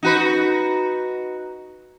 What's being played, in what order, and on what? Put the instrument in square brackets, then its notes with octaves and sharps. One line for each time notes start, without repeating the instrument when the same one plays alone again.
[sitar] D#4 F#4 B4